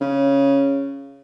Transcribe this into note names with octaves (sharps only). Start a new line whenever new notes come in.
C#3